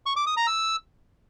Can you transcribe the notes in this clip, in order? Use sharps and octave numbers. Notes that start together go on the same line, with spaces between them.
C#6
D6
D#6
A#5
E6